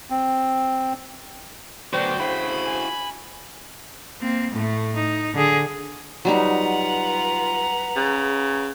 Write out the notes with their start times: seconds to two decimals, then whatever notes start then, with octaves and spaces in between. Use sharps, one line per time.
0.10 C4
1.93 D2 F#3 B3 F#4 C5 D5 G5
2.20 D2 C#3 E4 F#4 C5 B5
2.66 G#5
4.21 A#3 C4
4.51 A2 A3
4.96 D#4
5.34 D3 G#4
6.25 F#3 G3 D#4 F4 B4 F#5 A#5
7.96 C#3